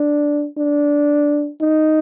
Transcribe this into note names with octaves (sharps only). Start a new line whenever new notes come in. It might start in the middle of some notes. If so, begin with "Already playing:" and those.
Already playing: D4
D4
D#4